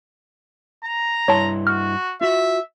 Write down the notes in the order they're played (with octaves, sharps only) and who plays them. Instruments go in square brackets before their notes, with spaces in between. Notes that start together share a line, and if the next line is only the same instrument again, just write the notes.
[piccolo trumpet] A#5
[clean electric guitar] G2 E4 C6 [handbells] C#5 A5
[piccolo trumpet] F#4 [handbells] F6
[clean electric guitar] F4 F#4 [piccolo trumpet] E5